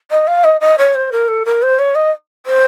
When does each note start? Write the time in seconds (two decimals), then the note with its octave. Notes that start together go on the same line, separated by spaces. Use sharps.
0.11 D#5
0.27 F5
0.44 D#5
0.61 D#5
0.78 C#5
0.95 C5
1.12 A#4
1.28 A4
1.45 A#4
1.62 C5
1.79 C#5
1.95 D#5
2.46 C5